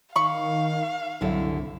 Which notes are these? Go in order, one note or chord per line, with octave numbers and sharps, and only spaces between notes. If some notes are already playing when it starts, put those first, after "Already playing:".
D#3 F5 B5 C#6
C2 F#2 D3 E4